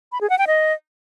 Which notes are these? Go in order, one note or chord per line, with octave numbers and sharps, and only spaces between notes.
B5
G#4
F#5
G5
D#5